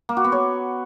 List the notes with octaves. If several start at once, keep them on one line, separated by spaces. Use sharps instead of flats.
A#3
F#4
B3
C#5